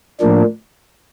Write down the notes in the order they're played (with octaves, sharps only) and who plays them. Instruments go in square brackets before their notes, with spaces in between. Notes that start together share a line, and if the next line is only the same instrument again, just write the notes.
[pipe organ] A2 F3 A#3 D4